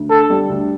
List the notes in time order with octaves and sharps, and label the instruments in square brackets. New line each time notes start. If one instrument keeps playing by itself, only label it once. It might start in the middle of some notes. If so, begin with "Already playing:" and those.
Already playing: [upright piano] D2
[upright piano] D3 [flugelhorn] A4
[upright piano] G3
D2